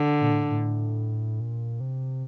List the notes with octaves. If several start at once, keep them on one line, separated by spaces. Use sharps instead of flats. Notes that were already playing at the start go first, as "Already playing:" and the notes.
Already playing: D3
A#2
A2
A2
A#2
C3